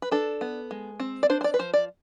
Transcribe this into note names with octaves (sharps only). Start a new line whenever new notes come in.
B4
D4 A4
B3
G#3
C4
D5
D4 C5
C5
D5
B4
F3 C5
D5